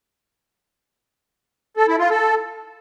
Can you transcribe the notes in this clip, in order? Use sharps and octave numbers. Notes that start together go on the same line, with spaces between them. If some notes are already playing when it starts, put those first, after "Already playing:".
A4
E4
F4
A4